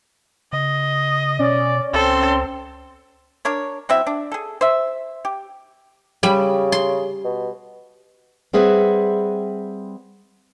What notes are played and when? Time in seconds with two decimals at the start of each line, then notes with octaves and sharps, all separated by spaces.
0.53 C#3 D#5
1.39 B2 C#4 D5
1.93 C#2 C4 A4 C6
3.45 D4 A#4 C#5
3.89 F#3 C4 E4 E5
4.07 D4
4.32 G#4 A4
4.61 C5 E5
5.25 G4
6.23 C#3 G3 B5
6.72 C6
7.24 B2
8.53 G3 C4 G#4 B4 E5 F#5